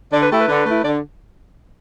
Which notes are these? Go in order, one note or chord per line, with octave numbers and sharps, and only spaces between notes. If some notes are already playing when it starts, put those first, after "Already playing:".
D3 D5
B4
A3 E4 G4
B4
D3
A3 E4
D3 D5